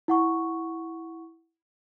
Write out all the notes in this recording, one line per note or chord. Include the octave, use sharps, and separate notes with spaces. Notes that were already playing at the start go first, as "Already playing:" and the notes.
E4 F#5 C#6